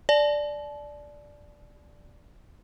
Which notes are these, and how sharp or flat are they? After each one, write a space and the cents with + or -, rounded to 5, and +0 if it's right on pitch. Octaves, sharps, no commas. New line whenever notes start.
D5 +0 A5 -35